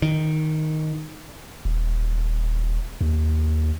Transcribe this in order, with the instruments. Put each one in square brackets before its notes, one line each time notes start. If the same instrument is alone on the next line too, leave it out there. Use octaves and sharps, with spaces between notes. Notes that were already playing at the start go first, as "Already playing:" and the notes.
[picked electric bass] D#3
[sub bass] D#1
D#2